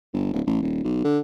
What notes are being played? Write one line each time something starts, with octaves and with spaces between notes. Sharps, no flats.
G1
D1
A1
D#1
B1
D3